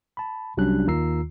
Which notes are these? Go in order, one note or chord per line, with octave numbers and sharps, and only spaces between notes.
A5 B5
C2 F#3 G3 C#4 D4 F#6
D#2 D#3 F4 A#5 E6 C7